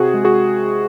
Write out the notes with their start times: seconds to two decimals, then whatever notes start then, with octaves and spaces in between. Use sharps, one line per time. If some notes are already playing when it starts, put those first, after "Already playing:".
Already playing: C3 F#4 G#4
0.14 G#3
0.24 F#4 G#4